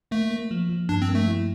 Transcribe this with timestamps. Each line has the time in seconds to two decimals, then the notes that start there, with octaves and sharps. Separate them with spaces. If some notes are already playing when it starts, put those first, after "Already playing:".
0.11 A3 A#3
0.31 A#3
0.51 F3
0.69 F3
0.89 G2 D4
1.02 C4
1.09 A#3
1.15 A3
1.28 E4